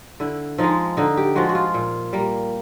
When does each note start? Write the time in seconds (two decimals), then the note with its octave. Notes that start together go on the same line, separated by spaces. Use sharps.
0.20 D3 E4
0.58 F3 G#3 D#4
0.97 D3 D#4
1.17 G4
1.36 F3 G#3 F#4
1.49 F#4
1.55 F4
1.74 A#2
2.13 G3 A#3